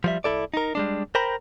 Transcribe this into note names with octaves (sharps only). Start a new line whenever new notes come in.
F3 G3 E5
C2 F2 E4 A4 D5
D#4 A#4
G3 G#3 D4
A#4 C5 G5 A#5 B5